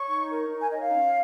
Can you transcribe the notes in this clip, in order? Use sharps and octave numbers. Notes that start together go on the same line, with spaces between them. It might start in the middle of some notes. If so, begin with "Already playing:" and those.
Already playing: C#5 C#6
D#4
A#4
D#4
G#5
C#5 D#5
F5
C#4